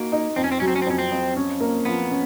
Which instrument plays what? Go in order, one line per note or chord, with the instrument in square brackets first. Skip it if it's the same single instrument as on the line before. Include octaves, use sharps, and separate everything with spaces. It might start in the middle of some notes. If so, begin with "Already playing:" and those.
Already playing: [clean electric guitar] A#3 [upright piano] D#4 F#4
[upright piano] D#4
[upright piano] F2 [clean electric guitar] C4
[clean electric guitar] C#4
C4
[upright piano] F#3 [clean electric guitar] C#4
[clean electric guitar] C4
C#4
C4
[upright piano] F2 [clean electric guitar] C#4
[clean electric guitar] C4
[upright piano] F2
C#4
A#3
[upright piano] F3 [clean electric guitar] B3
[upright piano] C#4